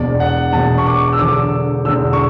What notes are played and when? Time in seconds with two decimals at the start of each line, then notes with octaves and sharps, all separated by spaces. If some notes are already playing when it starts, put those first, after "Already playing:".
Already playing: E1 E2 B2 D5
0.20 F#5
0.53 E1 E2 B2 A5
0.78 C#6
0.87 D6
1.13 E6
1.19 E1 E2 D3 D6
1.85 E1 E2 D3 E6
2.13 C#6